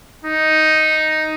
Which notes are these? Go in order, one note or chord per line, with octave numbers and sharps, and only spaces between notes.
D#4